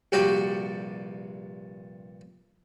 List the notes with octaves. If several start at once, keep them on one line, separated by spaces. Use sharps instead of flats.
A#1 G2 C3 F#4 G4 G5